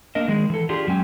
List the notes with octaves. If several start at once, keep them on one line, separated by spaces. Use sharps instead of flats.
A#3 D4 A#4 D#5
D#3 G#3 G#4
E3 A4
D4 F4 G4 G#4
F#2 F#3 G#3 C#4 G5 G#5